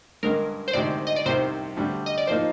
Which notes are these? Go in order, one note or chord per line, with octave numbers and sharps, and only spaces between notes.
G2 D3 G#3 A#4
C5
D2 C3 D#3 G#3 D5
D#5
D5
C2 C3 D#3 C5
D2 D3 G3
D#5
D5
F3 A#3 D#4 C5